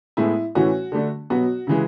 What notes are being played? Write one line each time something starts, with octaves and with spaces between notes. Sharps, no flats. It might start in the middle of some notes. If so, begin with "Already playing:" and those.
A2 G#3 B3 E4
A2 E3 A3 C#4 F#4
D3 A3 D4
B2 F#3 B3 F#4
C#3 E3 G#3